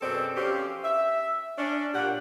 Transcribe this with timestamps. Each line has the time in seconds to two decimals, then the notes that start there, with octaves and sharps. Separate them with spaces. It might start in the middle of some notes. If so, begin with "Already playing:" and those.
0.01 F#2 B2 C4 G#4 A4 D5
0.36 F3 C4 C#4 G4
0.84 E5
1.58 C#4 D4
1.94 A#2 G4 F#5